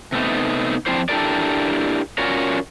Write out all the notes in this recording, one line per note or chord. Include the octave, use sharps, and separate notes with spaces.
C3 A3 B3 D#4
F3 C4 D4 E4 C5
D4 E4 G4 A4 A#4 D5
C#4 F4 F#4 A#4 C#5 D5